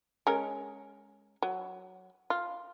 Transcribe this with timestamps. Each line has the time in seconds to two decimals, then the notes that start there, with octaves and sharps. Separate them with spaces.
0.27 G#3 C#4 A#4
1.42 F#3
2.30 F4